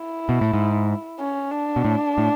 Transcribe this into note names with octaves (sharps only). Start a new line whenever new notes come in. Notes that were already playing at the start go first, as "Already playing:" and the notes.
Already playing: E4
B2
A2
G#2
C#4
D4
B2
A2
A2